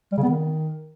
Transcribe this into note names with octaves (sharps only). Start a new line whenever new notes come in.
G3
C#3
B3
D#3